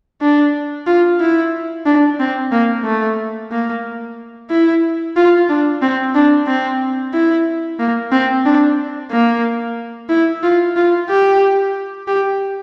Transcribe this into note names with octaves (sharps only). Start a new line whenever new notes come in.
D4
F4
E4
D4
C4
A#3
A3
A#3
E4
F4
D4
C4
D4
C4
E4
A#3
C4
D4
A#3
E4
F4
F4
G4
G4